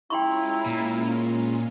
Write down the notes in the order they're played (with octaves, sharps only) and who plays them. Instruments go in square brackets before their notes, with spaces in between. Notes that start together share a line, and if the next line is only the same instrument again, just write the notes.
[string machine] G#3 C#4 F4 [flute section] E4 A#5 [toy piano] G5 C6 C#6
[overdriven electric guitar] A#2